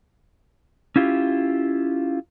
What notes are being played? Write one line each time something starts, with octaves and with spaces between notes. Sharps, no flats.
C#4 E4 F4 G4